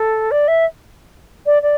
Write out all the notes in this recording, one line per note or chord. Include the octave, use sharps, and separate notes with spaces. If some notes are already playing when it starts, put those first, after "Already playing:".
Already playing: A4
D5
E5
D5
D5